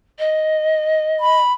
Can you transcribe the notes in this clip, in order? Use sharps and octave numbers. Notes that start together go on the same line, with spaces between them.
D#5
B5